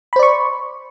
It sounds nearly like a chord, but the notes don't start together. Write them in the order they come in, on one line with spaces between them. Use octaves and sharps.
B5 C5 D5 C#6